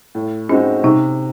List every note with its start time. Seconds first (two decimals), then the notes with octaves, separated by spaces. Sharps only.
0.15 A2
0.49 G#3 C4 C#4 D#4 F#4
0.84 C3 D#4